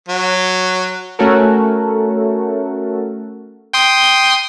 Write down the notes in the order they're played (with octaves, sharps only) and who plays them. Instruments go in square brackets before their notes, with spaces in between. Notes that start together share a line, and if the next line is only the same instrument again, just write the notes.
[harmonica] F#3
[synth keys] A3 C#4 F#4 A4 A#4
[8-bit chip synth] G5 C6 D#6